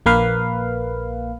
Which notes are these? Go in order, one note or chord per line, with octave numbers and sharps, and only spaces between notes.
A#1 A#3 B4 F5